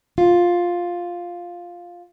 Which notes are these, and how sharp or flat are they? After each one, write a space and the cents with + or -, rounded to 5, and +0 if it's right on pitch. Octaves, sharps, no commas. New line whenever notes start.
F4 +5